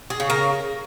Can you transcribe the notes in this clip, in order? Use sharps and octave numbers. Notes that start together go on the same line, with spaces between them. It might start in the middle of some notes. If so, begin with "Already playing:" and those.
G#4
C#3
A#4